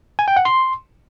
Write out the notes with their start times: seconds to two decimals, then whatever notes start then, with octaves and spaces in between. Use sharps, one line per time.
0.19 G#5
0.28 G5
0.36 F#5
0.45 C6